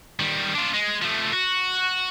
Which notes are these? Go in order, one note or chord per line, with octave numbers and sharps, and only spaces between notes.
D#3 G3
D4 F4
G#3
F3 A3
F#4